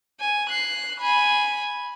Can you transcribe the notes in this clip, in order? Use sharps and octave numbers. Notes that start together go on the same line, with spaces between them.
G#5
F#6 C7
G#5 B5